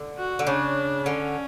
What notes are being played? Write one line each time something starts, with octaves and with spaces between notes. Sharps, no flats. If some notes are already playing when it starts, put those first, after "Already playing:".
Already playing: D3
F#4
D3
C#3 D4
D3 C#4